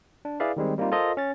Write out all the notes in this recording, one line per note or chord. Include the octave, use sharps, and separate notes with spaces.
D4
E4 G#4 B4 D5 E5 F5
D#3 G3 G#3 C4
G3 A#3 C4 D#4 F4
F4 A4 A#4 C5 D#5
C#4 A6